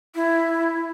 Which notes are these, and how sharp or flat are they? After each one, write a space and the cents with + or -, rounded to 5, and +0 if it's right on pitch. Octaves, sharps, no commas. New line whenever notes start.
E4 +10